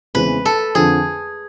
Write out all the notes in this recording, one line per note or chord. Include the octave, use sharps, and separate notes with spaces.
E2 C#3 E3 G#3 C4 B4
A4
F2 D3 F3 G#4